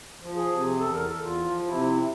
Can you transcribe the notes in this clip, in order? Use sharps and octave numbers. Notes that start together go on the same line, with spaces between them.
F3
G#4
C3
E2 A4
A#4
E2 A4
F4
F3
C3 E4